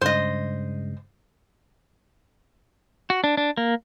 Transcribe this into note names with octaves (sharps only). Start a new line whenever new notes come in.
G2 C#3 G#3 C5 D#5
F#4
D4
D4
A#3